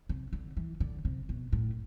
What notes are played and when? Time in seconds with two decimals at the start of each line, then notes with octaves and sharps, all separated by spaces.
0.09 C3
0.33 D3
0.57 E3
0.80 D3
1.05 C3
1.29 B2
1.53 A2